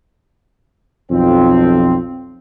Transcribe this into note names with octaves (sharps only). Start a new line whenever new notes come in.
B1 F2 F3 C4